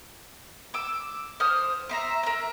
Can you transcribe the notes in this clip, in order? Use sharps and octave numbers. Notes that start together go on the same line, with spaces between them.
D6 E6
C5 D#6 F6
C5 E5 A#5
A#4 E5